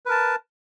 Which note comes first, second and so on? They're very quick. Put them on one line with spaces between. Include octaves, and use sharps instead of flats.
B4 A#4 A5